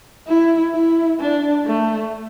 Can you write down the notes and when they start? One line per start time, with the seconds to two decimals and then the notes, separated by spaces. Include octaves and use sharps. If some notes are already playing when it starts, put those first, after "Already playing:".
0.28 E4
0.74 E4
1.20 D4
1.65 A3